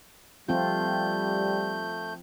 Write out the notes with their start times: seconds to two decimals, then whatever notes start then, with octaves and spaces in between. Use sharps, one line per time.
0.49 F3 G3 A3 C4 F4 G6